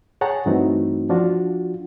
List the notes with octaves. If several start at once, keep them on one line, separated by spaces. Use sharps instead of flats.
G#4 C#5 F#5 G5 A5 A#5
G2 E3 A3 C4 D#4 F#4
F3 D4 F4 F#4